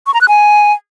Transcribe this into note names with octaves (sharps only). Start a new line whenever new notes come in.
C#6
A#5
F#6
G#5